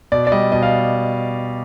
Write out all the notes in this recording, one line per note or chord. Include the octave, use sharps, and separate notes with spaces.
B2 D5
D5
G3 D#5
B2 D#5
F5